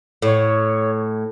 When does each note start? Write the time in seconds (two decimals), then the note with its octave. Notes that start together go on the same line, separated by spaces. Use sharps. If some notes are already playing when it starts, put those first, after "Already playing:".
0.22 A2 C#5